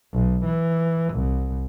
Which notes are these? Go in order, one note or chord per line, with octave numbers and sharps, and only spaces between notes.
B1
E3
C2